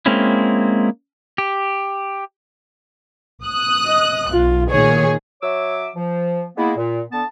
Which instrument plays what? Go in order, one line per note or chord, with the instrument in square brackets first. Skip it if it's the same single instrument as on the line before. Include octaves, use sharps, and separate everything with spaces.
[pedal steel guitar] G#3 A#3 C4 C#4 E4
G4
[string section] D#6 F#6
[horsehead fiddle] D#5
[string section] B1 [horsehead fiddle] F4
[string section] A#2 D#3 G#4 [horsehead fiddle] C#5
[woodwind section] F#3 C#5 E5 D6 E6
F3
G#3 A#3 B3 E4
A#2
D3 B3 A5